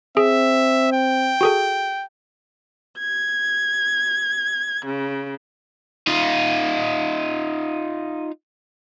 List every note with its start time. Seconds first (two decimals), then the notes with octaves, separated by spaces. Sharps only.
0.17 C4 G#4 E5
0.92 G5
1.41 F#4 G#4 A4
2.98 G#6
4.84 C#3
6.07 D#4 F4